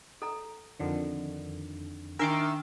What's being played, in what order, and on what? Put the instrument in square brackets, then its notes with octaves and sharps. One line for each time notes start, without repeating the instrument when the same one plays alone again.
[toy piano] A4 A#5
[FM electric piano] F2 D3 D#3
[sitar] D#3 E5 [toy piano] D4 [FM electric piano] A#4 C6 D6